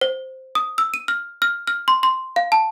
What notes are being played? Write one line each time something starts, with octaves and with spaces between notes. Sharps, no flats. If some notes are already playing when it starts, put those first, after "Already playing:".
C5
D#6
E6
D#7
F6
F6
F6
C6
C6
F5
A5